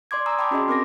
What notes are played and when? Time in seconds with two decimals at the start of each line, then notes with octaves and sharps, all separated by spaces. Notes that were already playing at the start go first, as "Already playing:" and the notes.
0.11 D5 C6 D6 G#6
0.26 G#5 A#5 C6 D#6 E6
0.39 G5 A5 B5 D6
0.51 C#4 F#4 G#4 D#5 C6
0.68 C4 A#4 D6 A#6